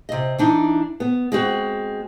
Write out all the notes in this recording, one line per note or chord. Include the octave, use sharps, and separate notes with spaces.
C3 D#5
E3 D4 D#4
B3
G#3 C4 F#4